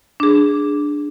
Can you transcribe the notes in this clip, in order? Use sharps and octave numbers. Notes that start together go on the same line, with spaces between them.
D4 G#4